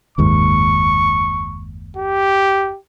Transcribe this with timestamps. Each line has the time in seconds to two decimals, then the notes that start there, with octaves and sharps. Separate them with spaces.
0.18 F#1 D#2 G#2 C#6
1.97 G4